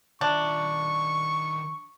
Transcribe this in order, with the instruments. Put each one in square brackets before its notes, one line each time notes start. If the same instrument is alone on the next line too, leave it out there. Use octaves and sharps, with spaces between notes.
[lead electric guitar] D#3 E5 [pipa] D4 [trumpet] C#6